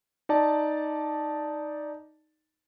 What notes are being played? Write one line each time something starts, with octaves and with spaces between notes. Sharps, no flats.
D#4 D5 A5